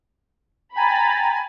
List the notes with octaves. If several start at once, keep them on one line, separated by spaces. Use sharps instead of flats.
G5 G#5 A#5 B5 A6